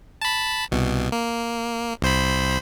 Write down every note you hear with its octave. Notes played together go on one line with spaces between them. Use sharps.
A5 B5
C2 B2
A#3
C2 C5 B5